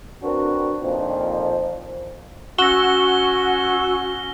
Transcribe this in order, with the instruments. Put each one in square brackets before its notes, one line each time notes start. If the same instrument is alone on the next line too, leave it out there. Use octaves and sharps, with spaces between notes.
[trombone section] C4 D4 F#4 A#4 B4
F2 A#2 D#3 F3
[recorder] C#4 [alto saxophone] F#4 [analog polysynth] F#5 C#6 E6 [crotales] A#6 G7